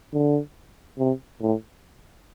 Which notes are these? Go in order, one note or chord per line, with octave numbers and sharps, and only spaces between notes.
D3
C3
A2